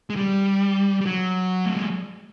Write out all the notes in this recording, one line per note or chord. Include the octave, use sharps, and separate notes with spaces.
G#3
G3
G3
F#3
A3
G#3